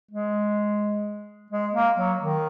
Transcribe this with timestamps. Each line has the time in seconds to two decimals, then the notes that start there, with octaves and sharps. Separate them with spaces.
0.11 G#3
1.51 G#3
1.74 A#3
1.97 F#3
2.20 D#3